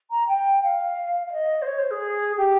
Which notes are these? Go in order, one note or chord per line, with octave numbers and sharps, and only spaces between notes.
A#5
G5
F5
F5
D#5
C5
C#5
C5
G#4
G4